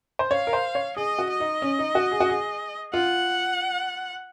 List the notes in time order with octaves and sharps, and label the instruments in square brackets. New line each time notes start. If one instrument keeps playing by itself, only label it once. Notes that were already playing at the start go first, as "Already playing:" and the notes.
[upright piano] C5
[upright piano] C#5 [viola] F5
[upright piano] A#4
C5
C#5
[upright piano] G#4 [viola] D#5
[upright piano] F#4
[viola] D#5
[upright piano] D#4
C#4
D#4
F#4
G#4
F#4
G#4
[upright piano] F4 [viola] F#5